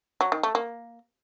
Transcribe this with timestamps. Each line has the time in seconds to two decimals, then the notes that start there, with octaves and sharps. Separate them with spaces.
0.21 F#3
0.32 D#3
0.43 A3
0.55 A#3